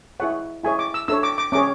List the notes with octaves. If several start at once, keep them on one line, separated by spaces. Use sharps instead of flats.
E4 G#4 C#5 F#5
E4 G#4 C#5 G#5
D6
E6
D4 A4 C#5 E6
D6
D6
C#4 G#4 C#5 D6